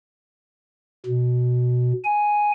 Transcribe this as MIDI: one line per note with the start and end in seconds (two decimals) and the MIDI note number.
1.06 1.93 47
2.05 2.52 80